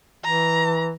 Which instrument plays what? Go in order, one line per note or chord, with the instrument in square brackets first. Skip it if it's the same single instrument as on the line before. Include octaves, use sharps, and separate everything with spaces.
[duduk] E3 [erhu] A#5